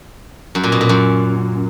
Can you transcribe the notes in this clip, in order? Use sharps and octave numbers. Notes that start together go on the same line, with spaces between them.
F#2
A#2
B2
A#2
F#2